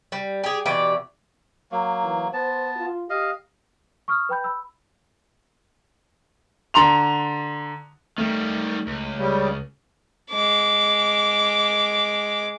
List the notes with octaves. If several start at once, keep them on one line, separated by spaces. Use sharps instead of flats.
G3
G4 G#4
B2 E3 G4 D5
F#3 A#3
E3
B3 C5 A5
F4
G4 D#5 F5
C#6 D#6 F6
B4 G5 B5 G6
B5 E6
D3 A#5 C6 F7
D#3 G3 A3
C#2
C#3 G3
G#3 D6